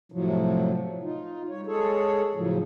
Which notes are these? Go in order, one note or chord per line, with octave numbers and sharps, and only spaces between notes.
A2 C3 F3 F#3
D#4 F4
G3 C#5
G#3 G#4 A4 C#5
A2 C#3 F3 F#3